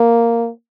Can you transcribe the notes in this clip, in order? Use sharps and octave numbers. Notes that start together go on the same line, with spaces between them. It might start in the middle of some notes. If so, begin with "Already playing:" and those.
Already playing: A#3